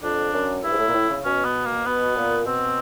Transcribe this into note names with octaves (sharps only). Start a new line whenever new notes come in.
F2 D4
F#2
G2 E4
G#2
A2
A#2
A2
C#3
B2 C#4
B3
A#3
B2 B3
A#2
B2 C4